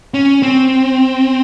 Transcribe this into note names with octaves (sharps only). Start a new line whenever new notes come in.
C#4
C4